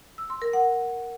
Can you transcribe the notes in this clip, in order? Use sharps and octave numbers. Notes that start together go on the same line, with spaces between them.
E6
C6
A#4
F#5